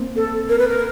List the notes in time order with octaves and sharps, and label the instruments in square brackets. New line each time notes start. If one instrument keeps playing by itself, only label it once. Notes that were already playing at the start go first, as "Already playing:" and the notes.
Already playing: [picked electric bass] A#3 C4
[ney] A4
A#4
B4
A#4